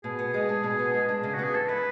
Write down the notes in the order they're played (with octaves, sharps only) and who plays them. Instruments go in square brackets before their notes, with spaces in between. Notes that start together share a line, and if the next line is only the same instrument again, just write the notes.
[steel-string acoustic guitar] B2 [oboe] G#4
[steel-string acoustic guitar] B3
[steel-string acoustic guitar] G#3 [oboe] G#4
[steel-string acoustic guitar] D4
B2
B3
G#3
D4
[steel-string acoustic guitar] C#3 [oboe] G#4
[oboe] F#4
[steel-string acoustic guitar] B3 [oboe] G#4
[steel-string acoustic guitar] E3 [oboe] A4
[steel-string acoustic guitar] E4 [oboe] B4